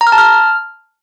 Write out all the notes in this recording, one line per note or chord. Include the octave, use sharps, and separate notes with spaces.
A#5
F6
A5
F6